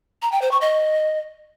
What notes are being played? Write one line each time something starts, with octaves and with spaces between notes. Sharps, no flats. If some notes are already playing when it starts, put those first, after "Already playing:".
A#5
G5
C5
C#6
D#5